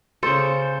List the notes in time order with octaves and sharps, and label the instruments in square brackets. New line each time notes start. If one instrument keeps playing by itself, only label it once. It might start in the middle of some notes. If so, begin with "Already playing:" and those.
[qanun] C#3 A4 [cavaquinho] C5